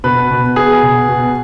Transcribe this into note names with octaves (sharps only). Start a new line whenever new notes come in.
B2 B4
B2
B2 G#4
B2
B2